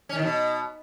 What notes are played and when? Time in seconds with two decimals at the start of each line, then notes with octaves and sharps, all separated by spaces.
0.09 C#4
0.16 D#3
0.22 B2